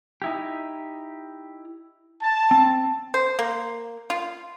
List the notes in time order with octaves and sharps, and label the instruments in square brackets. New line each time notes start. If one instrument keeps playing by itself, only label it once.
[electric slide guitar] D#4 E4 G4
[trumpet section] A5
[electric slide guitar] C4
[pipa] C5
A#3
F4